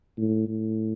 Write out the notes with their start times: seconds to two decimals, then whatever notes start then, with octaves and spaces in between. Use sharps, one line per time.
0.17 A2
0.48 A2